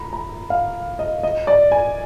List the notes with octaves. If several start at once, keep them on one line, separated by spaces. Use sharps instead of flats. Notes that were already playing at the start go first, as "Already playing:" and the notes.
Already playing: A#5 B5
A#5
F5
D#5
D#5
D5
G#5